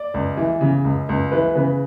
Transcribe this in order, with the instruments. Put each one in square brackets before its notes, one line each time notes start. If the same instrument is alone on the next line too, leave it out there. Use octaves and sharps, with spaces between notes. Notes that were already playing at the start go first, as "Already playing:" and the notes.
Already playing: [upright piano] D5
C#2
E3
C#3
C#2
C#2
E3 B4
C#3 B4